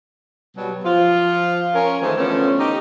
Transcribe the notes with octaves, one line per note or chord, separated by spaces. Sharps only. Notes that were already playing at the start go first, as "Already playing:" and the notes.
B2 F#3 G3
F3 F4
C#4 A#4
D#3 E3 G#3 A3 C4
D3 E3 F3 A3 B3 C#4
D#4 G4